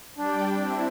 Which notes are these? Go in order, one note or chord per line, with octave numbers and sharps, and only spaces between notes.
G3 D4 D5 G5
C4 E4